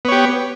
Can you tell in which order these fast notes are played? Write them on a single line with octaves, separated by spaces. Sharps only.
B3 C#5 G4